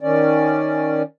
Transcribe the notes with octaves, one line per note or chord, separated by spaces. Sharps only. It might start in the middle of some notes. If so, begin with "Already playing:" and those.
D#3 C#4 D5